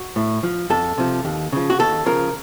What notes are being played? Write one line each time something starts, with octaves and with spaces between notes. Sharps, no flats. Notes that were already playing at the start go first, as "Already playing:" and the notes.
Already playing: F#4
A2
F3
F2 A4
C3 F3
D#2
C#3 F3
F#4
D#2 A4
C#3 F3 A#4